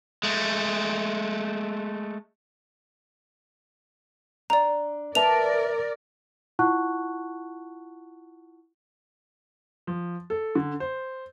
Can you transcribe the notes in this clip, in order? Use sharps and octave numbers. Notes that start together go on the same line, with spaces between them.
G#3 A3
D4 D5 A#5
A#4 B4 D5 E5 A5 F7
E4 F4 F#5 A5 C#6 F#6
F3
A4
D3
C5